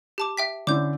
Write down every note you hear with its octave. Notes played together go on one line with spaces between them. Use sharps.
G4 A5 D6
E5 G5 B6
D3 C#4 E4 D6 G6